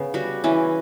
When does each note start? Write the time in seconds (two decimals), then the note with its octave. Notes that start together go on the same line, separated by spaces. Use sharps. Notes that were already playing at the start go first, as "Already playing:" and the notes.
Already playing: C#3 B3
0.14 G3 F#4
0.44 E3 C#4